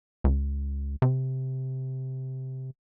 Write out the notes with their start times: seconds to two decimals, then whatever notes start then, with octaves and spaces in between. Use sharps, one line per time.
0.24 C#2
1.02 C3